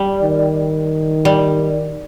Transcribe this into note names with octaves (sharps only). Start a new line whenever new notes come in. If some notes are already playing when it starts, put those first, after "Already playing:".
Already playing: G3
D#3
G3